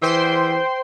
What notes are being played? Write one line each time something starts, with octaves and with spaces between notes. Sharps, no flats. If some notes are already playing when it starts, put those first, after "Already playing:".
E3 C5 G5 C6